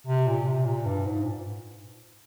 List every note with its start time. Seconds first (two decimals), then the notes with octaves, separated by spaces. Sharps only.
0.07 C3
0.27 A#2
0.47 C3
0.66 A#2
0.85 G2
1.05 G#2
1.24 A#2